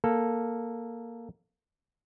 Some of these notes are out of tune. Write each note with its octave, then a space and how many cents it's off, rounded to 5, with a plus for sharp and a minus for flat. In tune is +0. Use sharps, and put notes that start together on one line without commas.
A#3 +0 A4 +0